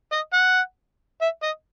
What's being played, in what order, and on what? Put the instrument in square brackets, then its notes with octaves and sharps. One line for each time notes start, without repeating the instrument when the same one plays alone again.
[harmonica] D#5
F#5
E5
D#5